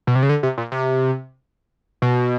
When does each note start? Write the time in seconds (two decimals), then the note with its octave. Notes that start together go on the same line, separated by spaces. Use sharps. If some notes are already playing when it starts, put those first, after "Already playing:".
0.07 B2
0.15 C3
0.23 C#3
0.29 D3
0.43 C3
0.58 A#2
0.72 C3
2.02 B2